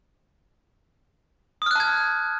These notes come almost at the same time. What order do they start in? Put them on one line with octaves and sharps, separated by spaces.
D#6 F6 F#6 A5 G#6